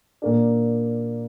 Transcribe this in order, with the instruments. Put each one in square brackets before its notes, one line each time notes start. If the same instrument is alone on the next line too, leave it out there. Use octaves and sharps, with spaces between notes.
[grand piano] A#2 A#3 D4